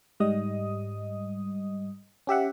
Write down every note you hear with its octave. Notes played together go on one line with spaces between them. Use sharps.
G#2 G3 D#5 D#6
C#4 G4 E5 F#5